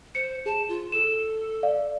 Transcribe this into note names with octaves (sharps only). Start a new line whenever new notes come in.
C5 C#7
G#4 A5
F4
A4 E7
D5 F5